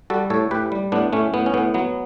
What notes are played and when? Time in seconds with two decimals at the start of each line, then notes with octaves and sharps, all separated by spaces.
0.10 G3 F#4 A4
0.30 A2 A4 C#5
0.51 A2 G4 B4
0.72 G3
0.92 A2 B3 D4
1.13 A2 A3 C#4
1.34 A2 B3
1.46 C#4
1.54 A2 B3
1.74 F#3 B3